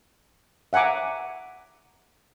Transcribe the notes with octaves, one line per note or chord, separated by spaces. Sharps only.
E5 F#5 G#5 A#5 D6